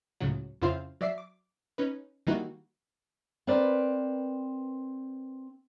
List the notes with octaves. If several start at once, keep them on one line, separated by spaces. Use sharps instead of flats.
C#2 A2 C#3 F#3
F2 C#3 E4 F4 C5 F5
F#3 D5 E5 C7
D6
C#4 D#4 B4
D#3 G3 A#3 D#4 E4 F#4
C4 A#4 B4 D5